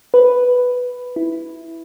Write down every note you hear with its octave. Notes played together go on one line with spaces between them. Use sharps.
B4
E4